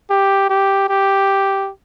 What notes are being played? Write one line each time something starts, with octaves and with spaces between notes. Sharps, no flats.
G4
G4
G4